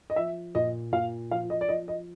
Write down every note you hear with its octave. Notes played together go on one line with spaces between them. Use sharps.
D#5
F3 E5
A#2 D#5
A#2 F5
F3 F5
D#5
D5
F3 D#5
D#5